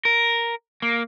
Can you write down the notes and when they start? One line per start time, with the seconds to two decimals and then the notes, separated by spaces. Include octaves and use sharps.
0.05 A#4
0.82 A#3